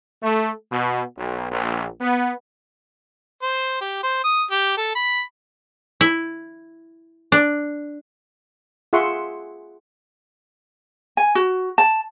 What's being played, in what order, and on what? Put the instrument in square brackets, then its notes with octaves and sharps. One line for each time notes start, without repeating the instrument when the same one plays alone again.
[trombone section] A3
B2
B1
A#1
B3
[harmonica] C5
G4
C5
D#6
G4
A4
B5
[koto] E4
D4
[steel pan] F4 G#4 E5 F#5 C6 C#6
[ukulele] G#5
F#4
A5